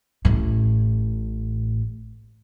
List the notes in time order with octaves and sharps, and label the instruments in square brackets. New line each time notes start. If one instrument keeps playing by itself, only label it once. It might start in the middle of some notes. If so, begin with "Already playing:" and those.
[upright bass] A1 A2